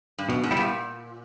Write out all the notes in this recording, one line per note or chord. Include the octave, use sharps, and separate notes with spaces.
G2
F#2 B2
G#2
B2 G3 B3 E4
A#2